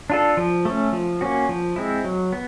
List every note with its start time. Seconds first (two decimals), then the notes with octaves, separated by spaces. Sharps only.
0.10 D4 F4 A4
0.37 F3
0.65 A3 C#4
0.92 F3
1.21 A#3 C#4 F#4
1.49 F3
1.76 G#3 C4 E4
2.04 F#3
2.33 B3